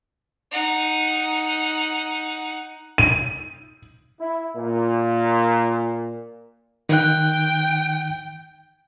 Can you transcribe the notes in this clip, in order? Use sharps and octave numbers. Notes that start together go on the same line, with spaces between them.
D#4 F#5
D#7
E4
A#2
D#3 G5 F#6